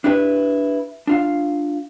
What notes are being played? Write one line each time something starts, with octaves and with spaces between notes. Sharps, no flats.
D4 E4 G4 B4
D4 F4 F5